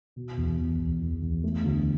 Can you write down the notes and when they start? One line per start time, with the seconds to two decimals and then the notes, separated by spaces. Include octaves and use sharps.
0.16 B2
0.37 E2
0.59 E2
0.79 E2
1.01 E2
1.22 E2
1.44 A3
1.64 D2